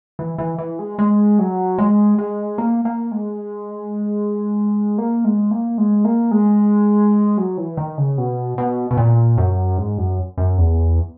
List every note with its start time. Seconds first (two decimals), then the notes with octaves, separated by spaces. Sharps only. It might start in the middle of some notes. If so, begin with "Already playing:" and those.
0.19 E3
0.38 E3
0.58 E3
0.79 G#3
0.99 G#3
1.39 F#3
1.78 G#3
2.18 G#3
2.58 A#3
2.85 A#3
3.12 G#3
4.98 A#3
5.25 G#3
5.51 A#3
5.78 G#3
6.05 A#3
6.31 G#3
7.38 F#3
7.58 E3
7.77 D#3
7.98 C#3
8.18 B2
8.58 B2
8.91 B2
8.97 A#2
9.38 F#2
9.78 G#2
9.98 F#2
10.38 F#2
10.58 E2